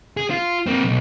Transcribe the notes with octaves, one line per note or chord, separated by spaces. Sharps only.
G#4
F4
A#3 C4
B1